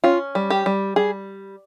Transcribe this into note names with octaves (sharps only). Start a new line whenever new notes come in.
C#4 F4
G3
G4
G3
G3 G#4